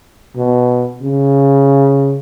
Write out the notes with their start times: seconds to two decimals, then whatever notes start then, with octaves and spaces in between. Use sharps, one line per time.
0.36 B2
1.02 C#3